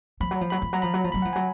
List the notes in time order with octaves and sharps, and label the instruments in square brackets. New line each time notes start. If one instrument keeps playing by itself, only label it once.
[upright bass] F3 [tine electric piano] B5
[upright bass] F#3
F3
[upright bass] F#3 [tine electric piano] B5
[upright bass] F3
[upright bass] F#3 [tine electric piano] A#5
[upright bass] F3 [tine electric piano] B5
[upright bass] F#3
F3
[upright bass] F#3 [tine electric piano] B5
[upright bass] F3 [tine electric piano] F#5
[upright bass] F#3 [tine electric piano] G#5